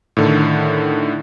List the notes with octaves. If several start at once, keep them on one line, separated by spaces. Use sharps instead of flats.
A2 D3 D#3